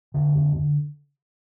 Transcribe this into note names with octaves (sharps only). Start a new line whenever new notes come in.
F2 D3
F2
D3